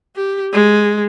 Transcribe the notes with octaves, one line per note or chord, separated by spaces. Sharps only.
G4
G#3